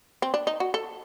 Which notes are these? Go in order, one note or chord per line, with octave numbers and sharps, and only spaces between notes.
C4
D4
D#4
F#4
A4